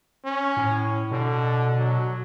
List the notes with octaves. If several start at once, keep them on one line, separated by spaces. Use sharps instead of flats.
C#4
A2
B2 D3
F#3